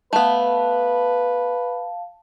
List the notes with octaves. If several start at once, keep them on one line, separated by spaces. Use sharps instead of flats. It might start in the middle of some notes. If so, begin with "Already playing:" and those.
A3 B3 B4 F5 A5